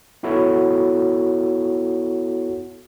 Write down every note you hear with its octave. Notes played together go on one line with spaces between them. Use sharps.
B3 E4 F#4 A4 C#5